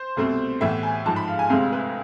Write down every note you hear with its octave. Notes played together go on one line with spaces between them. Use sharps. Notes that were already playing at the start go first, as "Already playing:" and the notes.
Already playing: C5
C2 B2 A3 C4
A2 E3 B3 E5
G#5
G#2 F3 G#3 A5
B5
F5
G#5
D2 C3 G#3 C4 F5
B4